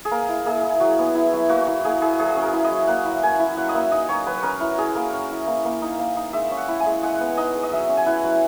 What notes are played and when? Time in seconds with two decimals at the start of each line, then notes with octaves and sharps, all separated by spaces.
0.05 G#4
0.11 A#3 A#4
0.29 E4
0.45 A#3 G#4
0.63 E4
0.80 F#3 F#4
0.98 B3
1.15 E4
1.33 F#3
1.49 A#3 F#4
1.67 E4 F#4
1.85 A#3 G#4
2.01 E4 G#4
2.18 F#3 G#4
2.36 C#4
2.42 A#4
2.53 E4
2.64 D#5
2.71 F#3
2.87 A#3 F#5
3.05 E4
3.23 A#3 G#5
3.39 E4
3.57 F#3 F#5
3.69 D#5
3.74 A#3 E5
3.91 D#4 D#5
4.09 F#3 C#5
4.26 F#3 B4
4.43 C#4 A#4
4.60 E4
4.78 F#3 G#4
4.95 A#3 A#4
5.13 C#4
5.31 E4
5.47 A#3
5.65 A#3
5.82 D#4
5.99 A#3
6.17 D#4
6.33 G#3 E5
6.51 C#4
6.57 F#5
6.68 E4
6.80 G#5
6.86 G#3
7.02 G#3 F#5
7.20 B3
7.37 D#4 D#5
7.55 G#3
7.63 D#5
7.72 F#3 E5
7.89 C#4
7.97 G#5
8.06 E4 F#5
8.24 F#3